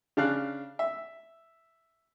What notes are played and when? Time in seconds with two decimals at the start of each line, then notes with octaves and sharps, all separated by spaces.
0.17 C#3 D4 F5 F#6
0.79 E5